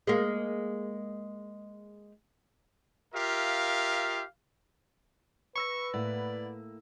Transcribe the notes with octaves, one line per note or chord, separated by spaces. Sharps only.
G#3 A#3
F4 G4 A#4 E5 F5
B4 B5 C#6 E6 A#6
A2 A#3 E4 D5 F#5 B5